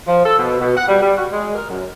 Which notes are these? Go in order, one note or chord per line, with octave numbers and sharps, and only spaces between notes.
F3
A4
B2
B2
F#5
G3
G3
F#4
G#3
A#4
F#2